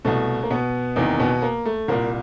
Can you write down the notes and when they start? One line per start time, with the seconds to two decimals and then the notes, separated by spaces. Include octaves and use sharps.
0.05 C2 B2 A3
0.43 A#3
0.50 B2 B3
0.96 E2 C3 D#3 A#3
1.20 B2 B3
1.42 A#3
1.65 A3
1.88 C2 A#2 A#3